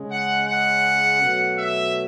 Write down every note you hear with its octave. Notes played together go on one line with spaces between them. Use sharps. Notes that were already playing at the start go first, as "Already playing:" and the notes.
Already playing: C#3 G#3
F#5
F#5
B2 F#3 A3
E5